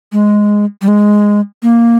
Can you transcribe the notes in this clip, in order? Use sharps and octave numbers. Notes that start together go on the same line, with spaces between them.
G#3
G3
G#3
A#3